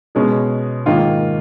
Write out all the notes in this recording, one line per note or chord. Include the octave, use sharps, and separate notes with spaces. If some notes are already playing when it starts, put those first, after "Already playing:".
B2 G#3 C#4 G#4
G#2 D#3 A#3 F4